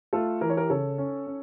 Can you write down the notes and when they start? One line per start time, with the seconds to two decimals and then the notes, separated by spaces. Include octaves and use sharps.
0.13 A3 F4 A4
0.41 E3 A#4
0.50 C#5
0.57 G4 A#4
0.70 C#3 A4 C#5
0.98 C#4
1.27 C#4